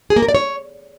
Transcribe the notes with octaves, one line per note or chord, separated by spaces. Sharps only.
G#4
A#3
A#4
D5
C#5